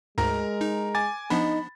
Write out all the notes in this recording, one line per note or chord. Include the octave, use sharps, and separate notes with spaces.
D2 G#2 G#3 A#4 A#5
D#4
G#5 D6 A6
F3 B3 D4 D#4 B5